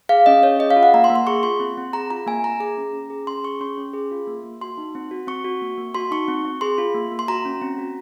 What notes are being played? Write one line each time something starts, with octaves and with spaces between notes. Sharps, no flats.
G#4 F5
C#4 D#5
C#4 C#5
G#4 D#5
F5
F4
F#5
A#3 A#5
C6
A#3
C6
G#4 C#6
F4 C6
C4
C4
G#4 A#5
F4 A#5
A#3 G#5
A#3 A#5
G#4 A#5
C#4
C#4
G#4
C#4 C6
G#4 C#6
C#4 C6
C#4
G#4
F4
A#3
A#3
F#4 C6
D#4
C4
F#4
C4 C#6
F#4
A#3
A#3
F#4 C6
D#4 C#6
C4
C4
G#4 C6
F4
A#3
A#3
C6
F#4 A#5
C#4
C4
F#4